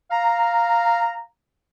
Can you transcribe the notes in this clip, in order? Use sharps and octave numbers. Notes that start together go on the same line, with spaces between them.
F5 A#5